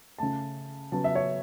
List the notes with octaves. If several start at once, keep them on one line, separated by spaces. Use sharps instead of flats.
C#3 A3 A5
C#3 F#3 B3 A5
E5
C#5